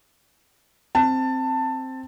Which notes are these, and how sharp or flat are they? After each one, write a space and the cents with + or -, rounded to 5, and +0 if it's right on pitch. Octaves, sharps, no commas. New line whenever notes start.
C4 +0 A5 +15